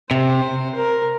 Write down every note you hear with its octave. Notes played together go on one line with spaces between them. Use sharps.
C3 C5
A#4